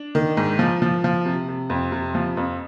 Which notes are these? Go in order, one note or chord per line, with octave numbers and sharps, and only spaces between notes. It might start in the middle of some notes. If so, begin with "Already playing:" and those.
Already playing: D4
D#3
G#2
F3
F3
F3
C3
C3
F2
C3
F3
F2